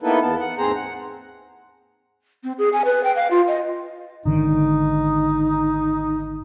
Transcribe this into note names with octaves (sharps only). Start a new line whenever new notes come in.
A#3 B3 D#4 E4 A4 B4
E2 B3 A5
F#5
D#2 G#2 C4 G#4 C5 A#5
F#5
C4
G#4
G#5
B4
G5
F5
F4
D#5
G#1 D3 D#3 D#4